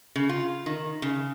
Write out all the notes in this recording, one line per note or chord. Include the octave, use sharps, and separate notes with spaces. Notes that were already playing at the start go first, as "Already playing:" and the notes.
C#3
F4
D#3
C#3